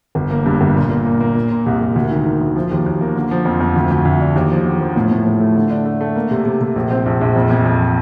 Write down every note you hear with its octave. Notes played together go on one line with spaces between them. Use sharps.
G1
A#3
G2
G1
A#2
A#2
A#3
A#3
A#2
A#2
C2
C2
D2
D#3
D#3
D2
F3
D#2
D#2
A#3
D3
F3
F2
F2
D2
D2
D2
D4
D#2
F3
D3
F3
A2
A2
A2
A3
D3
D4
A3
A3
A#3
C3
C3
C3
A#1
C4
A#1
A#1
F2
F2
F2